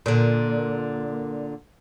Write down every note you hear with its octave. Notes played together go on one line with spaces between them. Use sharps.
A#2 D3